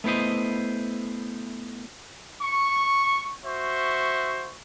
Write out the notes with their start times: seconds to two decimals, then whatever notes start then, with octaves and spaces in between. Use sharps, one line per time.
0.04 A3 B3 E4 C5 D#5
2.42 C#6
3.45 F#4 C5 E5 C#6